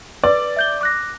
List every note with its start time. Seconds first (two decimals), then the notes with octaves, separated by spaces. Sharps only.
0.24 B4 D5
0.57 E5 G6 G7
0.81 D6 F#6 A#6